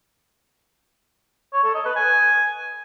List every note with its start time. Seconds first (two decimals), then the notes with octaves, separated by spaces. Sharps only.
1.53 C#5
1.64 A4
1.75 D#5
1.85 B4
1.96 G#5